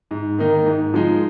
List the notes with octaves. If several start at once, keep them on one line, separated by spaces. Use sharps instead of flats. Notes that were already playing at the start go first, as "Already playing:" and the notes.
G#2
D#3 A#3 D#4
G#2
F3 G#3 D#4